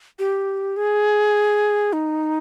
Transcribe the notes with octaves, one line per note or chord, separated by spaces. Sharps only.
G4
G#4
D#4